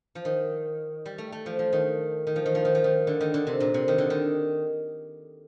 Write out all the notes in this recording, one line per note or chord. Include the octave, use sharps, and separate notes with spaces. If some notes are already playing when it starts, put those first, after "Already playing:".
F3
D#3
G3
A3
A3
F3
F3
D#3
D#3
F3
D#3
F3
D#3
F3
D#3
D3
D#3
D3
C3
A#2
C3
D#3
D3
D#3